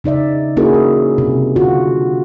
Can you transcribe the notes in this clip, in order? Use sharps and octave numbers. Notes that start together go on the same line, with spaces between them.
C#3 D#4 D5 E5
A#3 C#4 E4 F#4 G#4 A#4
C#4
C3
D3 F4 F#4